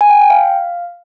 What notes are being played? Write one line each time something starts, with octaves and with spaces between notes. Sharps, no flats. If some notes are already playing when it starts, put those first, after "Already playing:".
G#5
G5
G5
F5